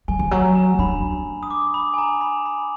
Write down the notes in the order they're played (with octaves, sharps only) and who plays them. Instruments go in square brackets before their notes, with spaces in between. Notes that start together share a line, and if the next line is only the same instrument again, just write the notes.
[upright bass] F#3 [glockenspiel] G#5
[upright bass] F3
[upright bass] F#3 [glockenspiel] A#5
[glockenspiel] A#5
[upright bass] D4 [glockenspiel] B5
[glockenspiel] D#6
D6
B5
G#5
A#5
B5
B5